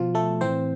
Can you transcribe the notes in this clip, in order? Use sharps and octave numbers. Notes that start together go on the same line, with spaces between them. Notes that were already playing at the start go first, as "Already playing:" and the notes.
Already playing: B2 F3 F4
A3 A4
A2 E3 C4 C5